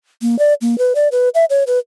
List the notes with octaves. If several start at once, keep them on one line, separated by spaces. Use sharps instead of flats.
A#3
D5
A#3
B4
D5
B4
E5
C#5
B4